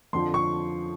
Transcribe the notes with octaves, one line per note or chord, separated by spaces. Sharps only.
F2 D3 F3 C6
C#6